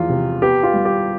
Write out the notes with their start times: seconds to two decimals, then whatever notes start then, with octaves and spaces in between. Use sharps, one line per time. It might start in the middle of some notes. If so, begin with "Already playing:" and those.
Already playing: E2 F3 F4
0.09 C3
0.42 B3 G4
0.63 F4
0.74 G3
0.85 G4